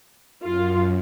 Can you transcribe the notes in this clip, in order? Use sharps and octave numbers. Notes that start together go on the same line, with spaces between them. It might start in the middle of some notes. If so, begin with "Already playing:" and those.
F#2 F4